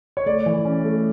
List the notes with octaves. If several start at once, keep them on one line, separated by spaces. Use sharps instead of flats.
C#5
A3 D5
E3
C#4
A3